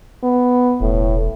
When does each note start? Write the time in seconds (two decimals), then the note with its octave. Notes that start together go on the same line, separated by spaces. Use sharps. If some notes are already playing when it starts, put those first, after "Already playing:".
0.23 B3
0.81 E1 A2